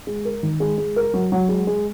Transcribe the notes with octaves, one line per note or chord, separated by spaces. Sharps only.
G#3
A#4
D#3
G#3
G#3
A#4
F#3
F#3
G#3
G#3